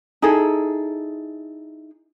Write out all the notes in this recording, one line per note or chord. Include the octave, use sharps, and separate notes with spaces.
D#4 E4 G#4 A4